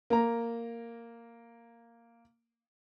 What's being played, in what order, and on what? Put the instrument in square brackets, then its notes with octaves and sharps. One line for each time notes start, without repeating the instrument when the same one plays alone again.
[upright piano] A#3 A#5